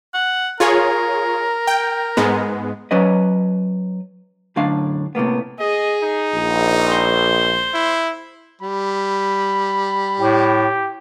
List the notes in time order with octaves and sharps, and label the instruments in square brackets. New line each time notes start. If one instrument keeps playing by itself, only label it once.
[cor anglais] F#5
[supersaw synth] F4 G#4 C#5 [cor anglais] A#4
[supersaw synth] G5
G#2 G#3 B3
[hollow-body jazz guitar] F#3 C#4 B4 D#5
F#2 A2 D3 D4 F5 C6
A2 C3 A#3 B3
[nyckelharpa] G#4 [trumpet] D#5
[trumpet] D#4
[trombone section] A#1
[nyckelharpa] C5
[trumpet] E4
[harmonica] G3 [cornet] B5
[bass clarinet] A2 [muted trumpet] G4